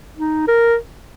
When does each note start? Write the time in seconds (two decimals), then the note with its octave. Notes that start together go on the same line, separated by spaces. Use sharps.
0.17 D#4
0.48 A#4